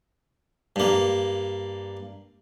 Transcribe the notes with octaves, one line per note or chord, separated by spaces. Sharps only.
G2 A#3